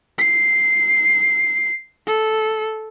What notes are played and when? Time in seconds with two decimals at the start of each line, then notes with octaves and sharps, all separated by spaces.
0.19 C7
2.07 A4